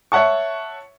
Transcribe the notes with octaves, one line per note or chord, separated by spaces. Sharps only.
C#5 E5 F#5 A5 C#6